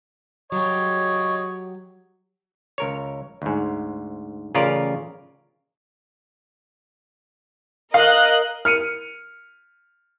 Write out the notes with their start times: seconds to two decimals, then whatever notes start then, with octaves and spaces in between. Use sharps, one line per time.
0.52 F#3 G4 C#5 D#5
2.78 C#2 A#4 C#5
3.42 D2 G#2
4.54 A1 C#3 F4 A#4 D5
7.94 A#4 D#5 F5 F#6
8.65 F6 C#7 D#7